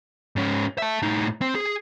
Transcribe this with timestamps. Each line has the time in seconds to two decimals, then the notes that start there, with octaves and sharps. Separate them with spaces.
0.36 G#2 C#4
0.78 E5 A5
1.02 A2 D#4
1.41 C4
1.55 G#4